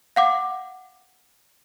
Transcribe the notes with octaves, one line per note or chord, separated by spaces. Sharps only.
F5 F#5 D6